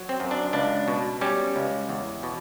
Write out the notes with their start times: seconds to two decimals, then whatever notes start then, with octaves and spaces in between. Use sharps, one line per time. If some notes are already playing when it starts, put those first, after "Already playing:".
Already playing: F#3
0.09 C4
0.20 F#2
0.31 D4
0.53 C#2 D4
0.88 B2
1.21 G3 C#4
1.56 C#2
1.89 E2
2.23 B2